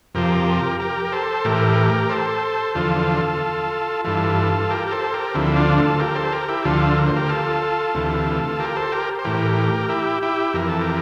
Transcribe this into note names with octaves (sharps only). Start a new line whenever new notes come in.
F2 C3 F3 G4 A#4
G4 A#4
A#4
A4 C5
A2 E3 G4 A#4
A4 C5
E2 D3 F3 F4 A4
G2 E3 F4 A4
G4 A#4
A#4
A4 C5
G4 A#4
D2 D3 F3 C4 E4
D4 F4
F4 A4
G4 A#4
A4 C5
G4 A#4
E4 G4
D2 D3 F3 F4 A4
A#4
C5
G4 A#4
F4 A4
D2 C3 E3
G4 A#4
A4 C5
G4 A#4
C5
A2 E3 G4 A#4
E4 G4
E4 G4
F2 E3 A#4
A4
G4 A#4